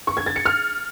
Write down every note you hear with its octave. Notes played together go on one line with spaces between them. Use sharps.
C#6
G#6
A6
C#7
F6